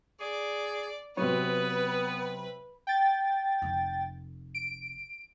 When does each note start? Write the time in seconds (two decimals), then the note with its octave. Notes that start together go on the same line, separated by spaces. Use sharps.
0.20 G#4 D5
1.17 C3 F#3 B3 B4 C#5
2.87 G5 A6
3.62 F1
4.55 D7